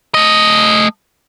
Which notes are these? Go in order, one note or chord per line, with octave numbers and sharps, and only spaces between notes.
A3 D#5